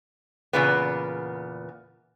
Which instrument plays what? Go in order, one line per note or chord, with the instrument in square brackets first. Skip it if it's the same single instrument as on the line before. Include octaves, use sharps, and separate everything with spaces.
[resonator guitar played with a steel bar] E2 A#2 C#3 B3